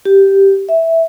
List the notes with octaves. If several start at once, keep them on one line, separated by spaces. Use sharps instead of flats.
G4
E5